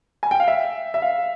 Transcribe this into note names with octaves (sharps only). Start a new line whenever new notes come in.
G#5
G5
F5
E5
E5
F5